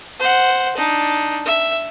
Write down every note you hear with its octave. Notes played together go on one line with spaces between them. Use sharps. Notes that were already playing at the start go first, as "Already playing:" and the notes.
C5 F#5
D4 D#4
E5